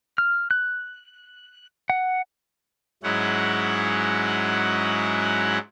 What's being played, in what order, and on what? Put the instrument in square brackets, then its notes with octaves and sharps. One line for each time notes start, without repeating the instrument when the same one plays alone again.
[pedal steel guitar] F6
F#6
F#5
[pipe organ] G#2 F#3 G#3 C#4 E4 F#5